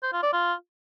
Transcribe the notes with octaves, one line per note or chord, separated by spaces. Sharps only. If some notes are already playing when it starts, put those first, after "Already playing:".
C5
F4
D5
F4